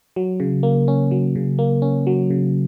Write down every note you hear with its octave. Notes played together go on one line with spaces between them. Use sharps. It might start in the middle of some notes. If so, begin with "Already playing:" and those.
F#3
C#3
A#3
C#4
F#3
C#3
A#3
C#4
F#3
C#3